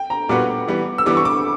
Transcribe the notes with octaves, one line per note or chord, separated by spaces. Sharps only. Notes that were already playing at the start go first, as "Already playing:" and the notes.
Already playing: G5
A#5
A#2 G3 B3 F#4 B4 D6
E3 G3 B3
E6
E3 G3 B3 D6
C#6
D6